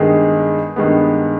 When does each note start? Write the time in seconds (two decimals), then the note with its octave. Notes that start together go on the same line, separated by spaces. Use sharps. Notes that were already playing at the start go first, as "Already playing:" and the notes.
Already playing: G2 D#3 G#3 B3 G#4
0.76 G2 D#3 G#3 B3